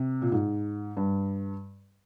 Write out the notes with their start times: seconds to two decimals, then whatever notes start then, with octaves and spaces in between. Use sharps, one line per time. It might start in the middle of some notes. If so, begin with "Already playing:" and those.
Already playing: C3
0.22 A#2
0.32 G#2
0.97 G2